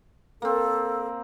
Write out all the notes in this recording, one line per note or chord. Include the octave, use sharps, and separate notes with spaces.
A#3 C4 A4